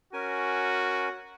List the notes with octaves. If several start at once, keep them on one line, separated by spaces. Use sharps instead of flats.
C#4 F#4 A#4 G#5